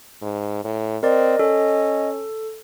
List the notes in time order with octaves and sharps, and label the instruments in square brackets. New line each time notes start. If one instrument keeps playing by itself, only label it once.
[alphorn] G#2
A2
[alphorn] C4 [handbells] A#4 D5 [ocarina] D#5
[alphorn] C#4 [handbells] A4